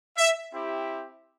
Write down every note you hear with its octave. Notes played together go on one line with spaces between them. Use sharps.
E5
C4 E4 G4